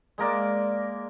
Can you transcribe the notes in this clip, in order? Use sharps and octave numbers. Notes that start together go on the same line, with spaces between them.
G#3 A#3 A#4 D5